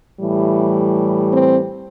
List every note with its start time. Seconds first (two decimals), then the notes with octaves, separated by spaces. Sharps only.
0.19 A2 E3 G3
1.31 C4